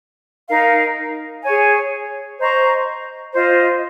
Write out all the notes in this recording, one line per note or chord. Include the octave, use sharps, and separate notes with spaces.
D#4 A#4 F5
G#4 C#5 G#5
C5 D#5 A#5 C#6
F4 C5 D#5